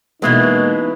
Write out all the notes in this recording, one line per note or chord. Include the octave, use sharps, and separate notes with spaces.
B2 E3 G#3 A#3 B3 C#4 D#4